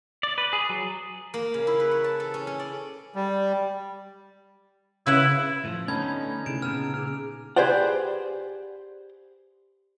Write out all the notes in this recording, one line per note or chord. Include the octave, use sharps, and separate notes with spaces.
D5
B4
G#4
F#3
A#3
C#3
E4
B4
C#5
A5
A4
C#4
C#4
D5
G3
C#3 E4 B4 F#5
A2 F3
D3 A3 B3 C#4 D#4 A5 B5 G#6
C3 E4 G#4 B5 D7
A#2 C#3 B3 A#5 E6 F6
G#4 D6 F6
G4 G#4 B4 C5 D5 F#5